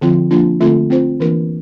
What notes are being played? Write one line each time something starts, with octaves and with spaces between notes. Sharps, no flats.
D3 F3 C4 F4
F3 A#3 D4 F4
D3 A3 C4 F4 A4
C4 F4 C5
E3 A#3 D4 F4 A#4